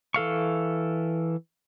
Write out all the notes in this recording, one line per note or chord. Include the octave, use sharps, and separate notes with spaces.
E3 A4 F5 C#6